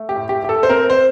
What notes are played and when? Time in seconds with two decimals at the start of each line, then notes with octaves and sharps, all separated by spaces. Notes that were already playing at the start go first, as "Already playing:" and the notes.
Already playing: A3
0.09 G4
0.16 A2
0.29 G4
0.42 A2 G4
0.49 A4
0.63 C5
0.69 C4 A#4
0.90 C5